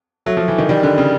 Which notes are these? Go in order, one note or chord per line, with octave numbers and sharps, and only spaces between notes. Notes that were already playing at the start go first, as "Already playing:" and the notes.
F#3 A3
F3
E3
D#3
D#3 G3
D3
C#3